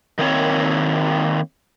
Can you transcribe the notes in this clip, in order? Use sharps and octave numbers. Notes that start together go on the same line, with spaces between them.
D#3 A#3 C4 C#5